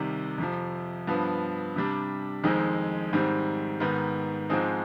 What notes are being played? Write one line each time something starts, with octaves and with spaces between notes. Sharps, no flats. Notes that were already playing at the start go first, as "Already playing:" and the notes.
Already playing: C2 C3 D#3
F2 C3 F3
G2 F3 B3
C3 G3 D4
F2 D#3 G#3 C4 D#4
G#2 D#3 G3 C4
G#2 D#3 B3
G#2 F3 G#3 C4 D#4